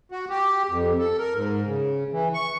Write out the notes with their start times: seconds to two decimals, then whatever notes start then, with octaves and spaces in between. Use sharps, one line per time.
0.12 F#4
0.29 G4
0.70 F2
0.98 A4
1.18 A#4
1.35 G#2
1.66 C#3
2.12 E3
2.34 C#6